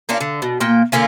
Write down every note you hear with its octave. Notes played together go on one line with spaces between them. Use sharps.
A#3 C#4 D4 F4
D3
B2
A#2 A#3 G5
D3 A#3 C#4 F4